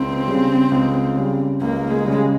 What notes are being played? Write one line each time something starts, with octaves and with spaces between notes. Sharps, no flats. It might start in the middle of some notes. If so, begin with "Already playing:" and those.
Already playing: C#2 C4
C#3 G3
C#2
C#3 G3
C#2 A#3
G#3
C#3 G3